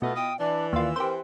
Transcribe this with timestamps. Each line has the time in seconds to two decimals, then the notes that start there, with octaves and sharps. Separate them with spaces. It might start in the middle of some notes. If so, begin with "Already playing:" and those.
0.02 B2 A3 B3 E4 F4 D#5
0.16 G5 D#6
0.39 E3 D4 D5
0.73 D#2 F4 E6
0.96 E3 C4 G4 A#4 C5